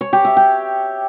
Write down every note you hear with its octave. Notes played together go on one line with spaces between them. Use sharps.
C#5
G4
E5
G5